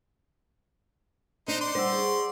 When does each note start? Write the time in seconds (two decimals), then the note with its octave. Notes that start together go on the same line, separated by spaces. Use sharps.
1.48 D4 D#4 C5
1.61 D5 C6
1.75 G3 C5 F#5 E6
1.92 G#4 F#5 C#6